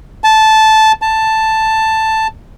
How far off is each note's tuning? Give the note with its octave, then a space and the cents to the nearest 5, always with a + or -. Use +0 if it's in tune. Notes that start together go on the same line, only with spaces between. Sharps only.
A5 -10
A5 +5